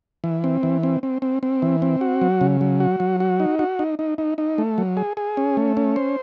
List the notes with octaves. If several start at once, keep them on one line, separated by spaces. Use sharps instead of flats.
E3
C4
E3
C4
C4
C4
C4
E3
C4
F#4
F#3
C#3
F#3
F#4
F#3
F#4
D#4
F#4
D#4
D#4
D#4
D#4
A3
F#3
G#4
G#4
C#4
A3
C#4
C5